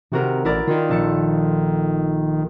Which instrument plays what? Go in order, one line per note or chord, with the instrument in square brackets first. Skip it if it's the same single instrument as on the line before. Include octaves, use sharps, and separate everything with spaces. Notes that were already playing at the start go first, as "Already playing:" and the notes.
[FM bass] C3 [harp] D#3 F#4 A#4
[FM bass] A1 [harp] E4 A#4 D5
[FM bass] D#3 [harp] F4
[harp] A#1 A4 C#7